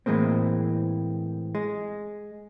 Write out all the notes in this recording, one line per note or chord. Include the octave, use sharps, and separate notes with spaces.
A2 E3 G#3 A#3 C4
G#3